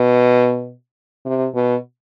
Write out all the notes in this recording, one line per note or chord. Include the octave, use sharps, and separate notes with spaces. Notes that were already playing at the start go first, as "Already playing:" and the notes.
Already playing: B2
C3
B2